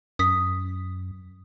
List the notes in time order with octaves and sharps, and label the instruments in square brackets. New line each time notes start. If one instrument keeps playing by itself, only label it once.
[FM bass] F#2 [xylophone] D#6 B6